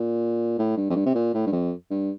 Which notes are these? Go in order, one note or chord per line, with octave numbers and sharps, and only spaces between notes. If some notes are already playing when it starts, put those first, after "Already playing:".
Already playing: A#2
A2
G2
F2
G2
C3
A#2
A2
G2
F2
G2